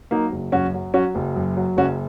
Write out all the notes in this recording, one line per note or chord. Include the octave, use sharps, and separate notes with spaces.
F#3 A#3 D#4
F#1
F#2 C#4 F#4
F#3
F#3 C#4 F#4
F#1
F#2
F#3
F#1 C#4 F#4